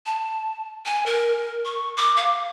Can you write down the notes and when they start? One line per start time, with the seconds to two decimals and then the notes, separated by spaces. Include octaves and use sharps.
0.06 A5
0.86 G#5
1.06 A#4
1.65 C#6
1.98 D6
2.17 F5